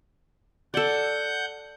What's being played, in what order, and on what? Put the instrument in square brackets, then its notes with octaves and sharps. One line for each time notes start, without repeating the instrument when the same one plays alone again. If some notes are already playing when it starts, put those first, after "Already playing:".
[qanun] A4 D5 [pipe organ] F#5 G6